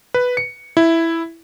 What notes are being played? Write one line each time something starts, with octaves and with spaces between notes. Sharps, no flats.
B4
C#7
E4